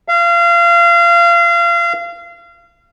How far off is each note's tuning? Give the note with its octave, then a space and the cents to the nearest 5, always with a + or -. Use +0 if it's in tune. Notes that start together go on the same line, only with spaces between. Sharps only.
F5 -30